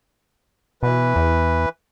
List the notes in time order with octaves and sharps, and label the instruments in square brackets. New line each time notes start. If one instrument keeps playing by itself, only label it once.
[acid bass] B2 [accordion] E3 B4
[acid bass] E2